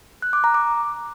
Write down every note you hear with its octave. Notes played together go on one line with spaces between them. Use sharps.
F#6
D6
A#5
D6